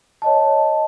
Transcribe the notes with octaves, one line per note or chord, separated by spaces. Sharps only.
C#5 D#5 A5